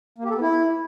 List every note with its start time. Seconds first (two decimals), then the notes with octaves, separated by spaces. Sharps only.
0.18 A#3
0.24 G4
0.30 A4
0.35 B3
0.41 E4